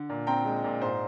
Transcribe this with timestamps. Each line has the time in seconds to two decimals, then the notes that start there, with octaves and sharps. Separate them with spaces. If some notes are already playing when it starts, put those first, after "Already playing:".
Already playing: D3
0.09 A#2
0.27 C4 G5 A#5
0.45 G#3
0.64 A#2
0.81 G#2 C5